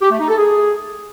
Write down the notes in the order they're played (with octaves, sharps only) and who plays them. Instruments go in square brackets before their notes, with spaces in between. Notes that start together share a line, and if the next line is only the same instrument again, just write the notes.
[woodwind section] G4
A3
D#4
A4
G#4